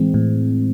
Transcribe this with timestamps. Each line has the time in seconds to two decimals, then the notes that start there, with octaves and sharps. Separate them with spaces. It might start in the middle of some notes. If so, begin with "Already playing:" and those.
Already playing: A2 E3 G#3 C4
0.14 A2